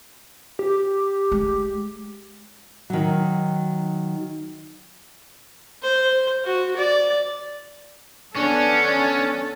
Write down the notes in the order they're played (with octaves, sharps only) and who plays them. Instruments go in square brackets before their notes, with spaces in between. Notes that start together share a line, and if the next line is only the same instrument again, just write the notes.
[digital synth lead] G4
[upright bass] G#3
[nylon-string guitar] D#3 F#3
[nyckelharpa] C5
F#4
D5
[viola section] B3 D4 [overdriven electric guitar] C#4 [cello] A4